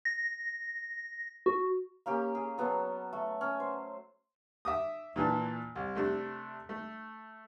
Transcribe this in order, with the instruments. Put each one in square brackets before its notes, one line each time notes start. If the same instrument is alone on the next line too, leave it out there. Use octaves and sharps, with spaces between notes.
[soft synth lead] A#6
F#4
[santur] A#3 C#4 G4
G#4
F#3 B3 A4
A3
C#4
C5
[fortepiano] E5 D6 D#6
A#2 E3 D4 A5
C2
C3 A3 D4
A3